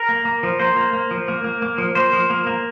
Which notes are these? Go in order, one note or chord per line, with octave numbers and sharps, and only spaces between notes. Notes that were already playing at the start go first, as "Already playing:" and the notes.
Already playing: A#4
A#3
A#3
F3
A#3 C5
A#3
A#3
F3
A#3
A#3
A#3
F3
A#3 C5
F3
A#3
A#3